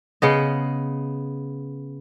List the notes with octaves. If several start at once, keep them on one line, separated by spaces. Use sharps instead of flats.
C#3 B3 D#5